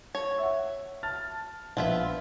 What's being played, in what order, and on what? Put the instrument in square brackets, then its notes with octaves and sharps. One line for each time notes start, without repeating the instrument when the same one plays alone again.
[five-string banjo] C#5
[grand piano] E5 F#5
A5 F6 A6
[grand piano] A#1 [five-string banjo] B3 F4 E5